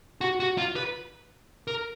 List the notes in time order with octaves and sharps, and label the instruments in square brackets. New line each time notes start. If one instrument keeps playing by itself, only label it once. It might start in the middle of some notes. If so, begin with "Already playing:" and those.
[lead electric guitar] F#4
F#4
F4
B4
A#4